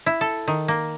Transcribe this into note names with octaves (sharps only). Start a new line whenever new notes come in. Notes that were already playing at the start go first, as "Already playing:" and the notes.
E4
A4
D#3
A#3